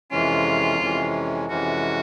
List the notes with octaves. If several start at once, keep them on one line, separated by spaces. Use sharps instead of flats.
F2 C3 E3 G#3 C#4 F4
F2 C3 E3 G#3 C#4
F2 C3 E3 G#3 C#4 F#4